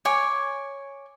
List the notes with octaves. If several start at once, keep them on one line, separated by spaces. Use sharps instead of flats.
C#5 G#5 D6